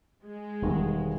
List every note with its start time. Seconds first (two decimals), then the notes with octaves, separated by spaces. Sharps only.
0.24 G#3
0.62 E1 D#3 G3